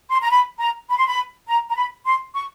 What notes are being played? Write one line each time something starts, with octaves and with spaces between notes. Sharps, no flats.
C6
A#5
B5
A#5
B5
C6
B5
A#5
A#5
B5
C6
C#6